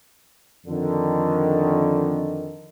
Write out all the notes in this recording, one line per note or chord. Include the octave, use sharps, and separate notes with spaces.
F2 D3 D#3